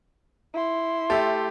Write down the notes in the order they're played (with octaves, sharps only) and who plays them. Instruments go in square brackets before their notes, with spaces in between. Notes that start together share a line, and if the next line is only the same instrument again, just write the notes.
[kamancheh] E4 C6
[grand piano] A3 G4 [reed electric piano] E5 A5